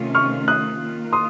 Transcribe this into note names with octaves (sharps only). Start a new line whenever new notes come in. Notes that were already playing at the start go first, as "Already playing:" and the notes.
Already playing: C3 D#3 A3 C#4 F4
C#6 F6
D#6 F#6
D#3 A#3 F4
C6 D#6